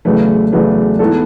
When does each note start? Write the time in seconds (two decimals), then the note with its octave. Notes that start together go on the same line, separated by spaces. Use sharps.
0.05 E2 C#3 F#3 A3 B4
0.53 E2 C#3 F#3 A3 B4
0.99 G#2 E3 B3 E4 A4